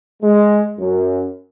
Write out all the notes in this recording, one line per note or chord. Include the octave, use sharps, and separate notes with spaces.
G#3
F#2